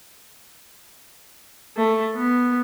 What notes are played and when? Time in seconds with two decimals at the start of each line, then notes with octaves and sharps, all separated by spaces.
1.77 A3
2.16 B3